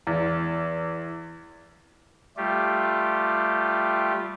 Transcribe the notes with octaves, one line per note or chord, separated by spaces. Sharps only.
E2
G3 A3 F4 G4